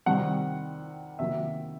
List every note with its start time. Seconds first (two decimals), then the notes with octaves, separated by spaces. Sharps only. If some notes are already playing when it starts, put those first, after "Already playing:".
0.06 C3 D#3 G3 C4 F#5
1.19 C3 D#3 F#3 A#3 E5